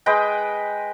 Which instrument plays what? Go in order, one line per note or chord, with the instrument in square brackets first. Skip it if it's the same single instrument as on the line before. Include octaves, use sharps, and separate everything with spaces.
[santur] G#3 B4 D#5 G5